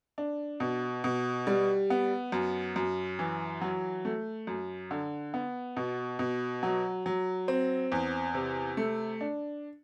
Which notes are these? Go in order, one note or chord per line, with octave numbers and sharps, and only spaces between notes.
D4
B2
B2
G3
B3
F#2
F#2
E3
F#3
A3
F#2
D3
B3
B2
B2
F#3
F#3
C4
E2
C3
A3
D4